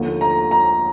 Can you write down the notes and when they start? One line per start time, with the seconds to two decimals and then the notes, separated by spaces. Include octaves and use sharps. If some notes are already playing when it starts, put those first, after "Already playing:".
Already playing: D#2 D3 F3 A3
0.21 A#5
0.51 A#5